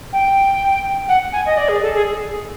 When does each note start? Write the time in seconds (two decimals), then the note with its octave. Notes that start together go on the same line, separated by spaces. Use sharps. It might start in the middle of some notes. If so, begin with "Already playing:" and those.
0.13 G5
1.08 F#5
1.32 G#5
1.46 D#5
1.57 D5
1.69 G#4
1.82 A4
1.93 G#4